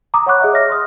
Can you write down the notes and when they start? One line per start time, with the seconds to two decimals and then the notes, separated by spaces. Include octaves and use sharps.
0.14 A#5 D6 D#6
0.26 C#5 F#5 B5 C#6 D6 F#6
0.41 G#4 D#5 E5
0.53 C#5 D#5 E5 F6 A#6
0.70 C6 D#6 F6